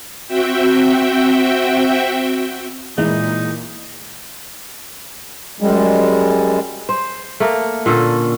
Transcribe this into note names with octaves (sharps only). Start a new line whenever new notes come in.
C4 F#4 E5 G5
A#2 E3 G#3 D#4
F#2 G3 G#3
C5
A3 A#3 A#4
A#2 D3 C#4 A4